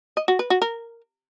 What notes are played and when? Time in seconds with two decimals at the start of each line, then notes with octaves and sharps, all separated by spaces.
0.17 D#5
0.28 F#4
0.39 B4
0.50 F#4
0.62 A#4